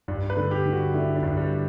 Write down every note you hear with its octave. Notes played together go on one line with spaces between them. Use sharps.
G2
B4
D3
G4
D3
F#4
D3 E4
D4
G2
G3